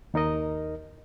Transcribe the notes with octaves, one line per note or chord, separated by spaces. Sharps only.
D#2 D#4 A#4 D#5